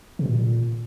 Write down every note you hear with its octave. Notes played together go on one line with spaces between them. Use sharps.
C3
A#2